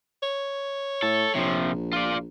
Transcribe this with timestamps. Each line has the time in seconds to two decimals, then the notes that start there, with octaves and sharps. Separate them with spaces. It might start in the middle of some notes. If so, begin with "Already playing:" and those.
0.23 C#5
1.02 A2 A4
1.35 A#1 C3 F3
1.93 F4 D5